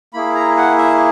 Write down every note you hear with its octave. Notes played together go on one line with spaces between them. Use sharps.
A#3 E4 G#4 B5
A#5
F#5
E5